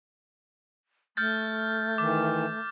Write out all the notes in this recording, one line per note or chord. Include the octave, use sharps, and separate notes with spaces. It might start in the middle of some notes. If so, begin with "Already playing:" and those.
A3 F6 G6 A6
D#3 E3 D6